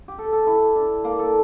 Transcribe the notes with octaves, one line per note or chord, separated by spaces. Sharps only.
G4
A4
A4
E4
D4
A#3
A4